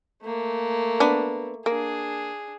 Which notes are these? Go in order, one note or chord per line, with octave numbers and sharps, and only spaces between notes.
A3 A#3
B3 D4
A#3 D4 G#4